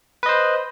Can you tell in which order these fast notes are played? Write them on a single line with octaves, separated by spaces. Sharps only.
B4 D#5 C5